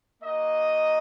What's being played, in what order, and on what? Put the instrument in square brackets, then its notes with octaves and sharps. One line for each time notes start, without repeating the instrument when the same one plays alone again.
[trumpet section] A#3 D#4 F#4 D#5